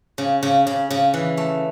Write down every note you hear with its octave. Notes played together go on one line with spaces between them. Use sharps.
C#3
C#3
C#3
C#3
E3
A3